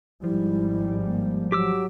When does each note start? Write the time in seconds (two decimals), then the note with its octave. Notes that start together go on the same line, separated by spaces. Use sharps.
0.24 G#1 G#2 F3 G3 E4
1.06 A#3
1.52 F#3 G4 D6 E6